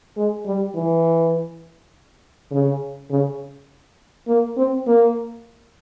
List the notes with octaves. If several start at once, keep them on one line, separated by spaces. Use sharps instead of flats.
G#3
G3
E3
C#3
C#3
A#3
C4
A#3